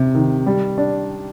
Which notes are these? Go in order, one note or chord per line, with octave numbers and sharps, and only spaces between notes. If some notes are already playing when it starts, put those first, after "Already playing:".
Already playing: C3
D#3
G3
D4